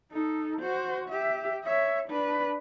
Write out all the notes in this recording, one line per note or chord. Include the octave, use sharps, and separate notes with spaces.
D#4 A4
F#4 C5
G4 E5
C#5 E5
D4 B4